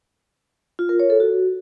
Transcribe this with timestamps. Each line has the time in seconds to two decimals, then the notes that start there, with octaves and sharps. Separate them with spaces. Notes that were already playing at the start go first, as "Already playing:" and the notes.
0.79 F4
0.89 A#4
1.00 C#5
1.10 A4
1.20 F#4